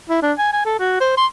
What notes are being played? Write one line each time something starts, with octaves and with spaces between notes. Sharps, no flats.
E4
D4
G#5
G#5
A4
F#4
C5
C6